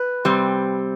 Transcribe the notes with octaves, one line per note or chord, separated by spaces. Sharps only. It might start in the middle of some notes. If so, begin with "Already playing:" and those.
Already playing: B4
C3 G3 C4